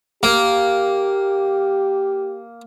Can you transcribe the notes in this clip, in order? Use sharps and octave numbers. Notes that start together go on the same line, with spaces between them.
A#3 G4